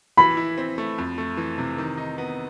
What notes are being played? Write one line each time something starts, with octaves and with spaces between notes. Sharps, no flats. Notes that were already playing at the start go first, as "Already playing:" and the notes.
E3 B5
E4
C4
A3
F2
A3
E3
C3
D#3
D#4
B3